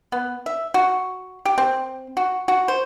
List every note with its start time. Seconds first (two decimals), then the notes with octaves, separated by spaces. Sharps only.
0.12 B3
0.46 E5
0.74 F#4
1.45 G4
1.58 C4
2.17 F#4
2.48 F#4
2.68 C5